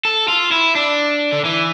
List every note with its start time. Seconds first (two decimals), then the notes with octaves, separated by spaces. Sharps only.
0.05 A4
0.28 F4
0.51 E4
0.75 D4
1.32 D3
1.45 E3